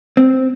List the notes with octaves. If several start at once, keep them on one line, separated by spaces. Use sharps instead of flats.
C4